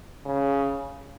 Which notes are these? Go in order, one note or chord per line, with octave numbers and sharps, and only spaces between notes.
C#3